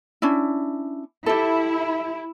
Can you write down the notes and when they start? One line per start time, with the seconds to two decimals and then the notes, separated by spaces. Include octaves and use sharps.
0.22 C#4 D4 E4
1.26 E4 G4 A4